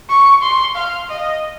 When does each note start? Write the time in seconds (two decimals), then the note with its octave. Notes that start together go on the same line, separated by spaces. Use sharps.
0.10 C#6
0.42 C6
0.75 F5
1.09 D#5